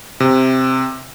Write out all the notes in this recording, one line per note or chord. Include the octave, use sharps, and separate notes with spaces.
C3